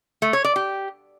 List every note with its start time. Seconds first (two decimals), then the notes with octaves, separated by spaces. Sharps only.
0.22 A3
0.33 C#5
0.44 D5
0.56 G4